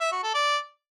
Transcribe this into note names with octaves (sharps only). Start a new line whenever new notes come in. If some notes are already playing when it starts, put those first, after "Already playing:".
E5
F#4
A4
D5